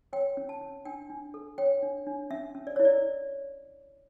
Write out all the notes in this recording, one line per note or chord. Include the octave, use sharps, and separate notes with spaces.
C#5 G5
C#4
A5
C#4
D4 G5
D4
A4
C#5 G5
D4
D4
C#4 E5
C#4
D5
E4 C#5
D5